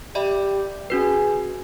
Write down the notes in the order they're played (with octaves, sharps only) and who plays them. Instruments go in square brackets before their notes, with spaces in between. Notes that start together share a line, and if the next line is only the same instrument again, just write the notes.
[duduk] G4 [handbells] D5 E5 B5
[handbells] C#4 F#4 B4 [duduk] G#4